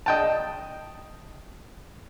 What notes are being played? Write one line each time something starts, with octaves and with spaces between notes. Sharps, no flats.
D#5 G5 A5